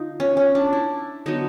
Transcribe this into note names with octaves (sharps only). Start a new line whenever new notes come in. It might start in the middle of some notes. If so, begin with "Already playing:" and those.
Already playing: D3 D#4 F4
C#4
C#4
D4
E4
D3 F#3 B3 D#4